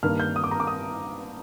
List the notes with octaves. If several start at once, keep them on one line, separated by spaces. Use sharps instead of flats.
G2 D#3 A#3 F6
G6
D#6
D6
A#5
D6
D#6